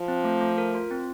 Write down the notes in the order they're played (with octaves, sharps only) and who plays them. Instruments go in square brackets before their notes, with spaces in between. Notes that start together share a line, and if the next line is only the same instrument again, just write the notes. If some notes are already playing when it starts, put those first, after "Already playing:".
Already playing: [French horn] F3
[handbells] C4
A3
A3
A#4
F4
C4